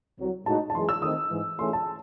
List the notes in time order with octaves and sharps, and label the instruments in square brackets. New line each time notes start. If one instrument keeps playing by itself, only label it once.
[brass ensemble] C2 C3 F#3
[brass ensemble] A2 G#3 D#4 F#4 [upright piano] A5
[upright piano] A5
[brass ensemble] F#2 E3 G#3 [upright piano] C6
[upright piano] E6
[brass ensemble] D#3 A3 C4 D#4 [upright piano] D#6
[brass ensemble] G#2 E3 G#3
[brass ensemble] E3 A3 C#4 G#4 [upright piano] C6
[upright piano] A5